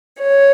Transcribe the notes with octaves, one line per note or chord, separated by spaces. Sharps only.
C#5